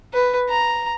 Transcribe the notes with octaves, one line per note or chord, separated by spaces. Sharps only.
B4
A#5